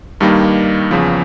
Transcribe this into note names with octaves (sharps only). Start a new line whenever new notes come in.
G2 D#3 G3 A#3 D#4
E2 C#3 F3